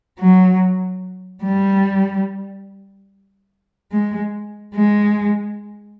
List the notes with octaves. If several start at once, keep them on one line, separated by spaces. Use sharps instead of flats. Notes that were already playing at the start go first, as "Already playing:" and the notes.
F#3
G3
G#3
G#3